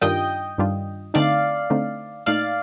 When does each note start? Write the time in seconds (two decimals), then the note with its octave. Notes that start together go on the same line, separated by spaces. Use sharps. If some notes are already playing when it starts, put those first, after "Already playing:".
0.02 G2 D#3 G3 D4 F4 D#5 G5
0.58 G2 D#3 G3 D4 F4
1.14 D3 A3 C4 D#4 D5 F5
1.70 D3 A3 C4 D#4
2.26 A#2 A3 D#4 D5 F5